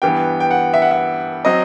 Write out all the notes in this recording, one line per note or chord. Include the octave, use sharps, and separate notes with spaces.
G2 E3 B3 G5
G5
F#5
E5
F#5
E5
F#3 C4 D#5